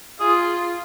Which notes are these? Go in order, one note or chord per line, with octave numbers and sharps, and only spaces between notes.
F4 G#4